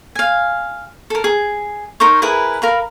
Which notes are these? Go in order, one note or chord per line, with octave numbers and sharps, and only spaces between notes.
F5 G#5
A4 A#4
G#4
D#4 A#4 C5 C#5
E4 G#4 A#4 B4
A#4 F5 B5